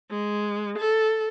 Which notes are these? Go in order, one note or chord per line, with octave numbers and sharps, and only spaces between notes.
G#3
A4